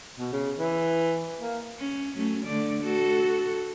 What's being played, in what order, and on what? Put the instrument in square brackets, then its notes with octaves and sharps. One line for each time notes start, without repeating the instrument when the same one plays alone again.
[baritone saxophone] B2
C#3
E3
A#3
[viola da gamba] C#4
F#3 A3 C#4
D3 A3 D5
F#4 A4